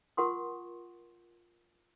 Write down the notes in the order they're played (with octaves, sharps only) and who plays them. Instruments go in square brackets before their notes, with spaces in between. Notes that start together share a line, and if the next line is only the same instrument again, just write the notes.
[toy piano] F4 A#4 F#5 C6 C#6 D#6